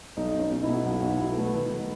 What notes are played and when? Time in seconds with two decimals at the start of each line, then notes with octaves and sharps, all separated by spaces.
0.17 B1 D#4
0.28 D#4
0.34 B1
0.39 C#4
0.51 B2 D#4
0.63 E4
0.68 B2
0.73 F#4
0.85 B1 F#4
1.02 B1
1.20 B1 E4
1.29 B3
1.37 B1 A3
1.46 B3
1.54 D#3
1.71 D#3
1.79 D#4